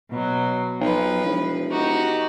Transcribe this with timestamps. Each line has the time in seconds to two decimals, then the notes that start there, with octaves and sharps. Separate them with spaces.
0.10 B2 F#3
0.80 B1 F3 B4
1.24 E1
1.70 D#4 F#4 G4